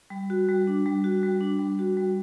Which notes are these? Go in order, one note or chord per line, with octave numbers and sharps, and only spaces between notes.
G3
F#4
G3
D4
G3
F#4
G3
D4
G3
F#4
G3